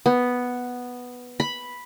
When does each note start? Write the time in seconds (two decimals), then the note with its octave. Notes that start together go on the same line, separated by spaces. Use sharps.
0.06 B3
1.40 B5